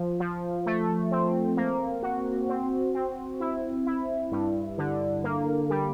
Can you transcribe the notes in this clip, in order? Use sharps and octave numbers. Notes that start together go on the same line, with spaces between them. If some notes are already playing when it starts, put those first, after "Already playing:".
Already playing: F3
F3
A3
C4
A#3
F#4
C4
C4
E4
E4
G2
D3
A#3
G3